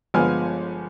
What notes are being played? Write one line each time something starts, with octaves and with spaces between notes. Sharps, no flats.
G1 F3 G#3 B3 G#5 F6